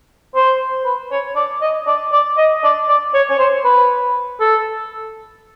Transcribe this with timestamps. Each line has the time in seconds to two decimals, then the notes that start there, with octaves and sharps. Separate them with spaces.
0.35 C5
0.85 B4
1.11 C#5
1.36 D5
1.62 D#5
1.87 D5
2.12 D5
2.37 D#5
2.64 D5
2.88 D5
3.14 C#5
3.30 C#5
3.39 C5
3.65 B4
4.40 A4